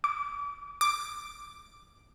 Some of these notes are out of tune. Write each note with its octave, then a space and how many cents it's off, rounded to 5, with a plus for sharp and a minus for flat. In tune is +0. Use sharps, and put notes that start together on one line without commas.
D6 -35
D6 +0